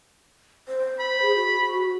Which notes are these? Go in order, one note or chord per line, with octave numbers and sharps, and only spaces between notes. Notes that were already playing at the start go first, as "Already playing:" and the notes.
C5
B5
G#4
F#4